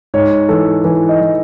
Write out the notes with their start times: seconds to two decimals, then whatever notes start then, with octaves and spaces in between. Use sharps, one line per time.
0.14 G#2 C#5
0.49 E3 A4
0.84 E3
1.09 D#5
1.21 E3